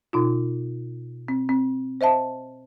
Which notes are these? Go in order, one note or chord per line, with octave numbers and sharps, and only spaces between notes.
B2 D#4 F4
C4
C4
C5 D#5 E5 A5